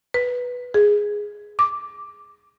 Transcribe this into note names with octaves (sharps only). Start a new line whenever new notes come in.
B4
G#4
D6